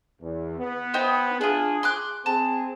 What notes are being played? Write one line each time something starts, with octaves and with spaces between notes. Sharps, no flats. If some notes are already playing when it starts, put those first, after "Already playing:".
E2
B3
D#4 G4 C5
D4 F4 G#4
C6 D6 F#6
C4 G#4 A5